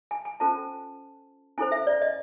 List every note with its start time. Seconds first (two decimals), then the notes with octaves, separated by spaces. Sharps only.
0.11 G#5
0.25 G#5
0.40 C#4 F4 A4 C5 A5
1.58 C#4 E4 A4 C5 G#5
1.72 E5
1.87 D5
2.02 D#5